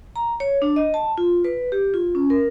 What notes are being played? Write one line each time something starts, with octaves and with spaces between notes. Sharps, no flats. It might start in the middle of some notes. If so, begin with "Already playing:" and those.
A#5
C#5
D4
D#5
A5
F4
B4
G4
F4
C#4
A#4